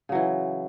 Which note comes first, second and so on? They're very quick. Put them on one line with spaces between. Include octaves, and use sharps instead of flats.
C#3 F#3 E3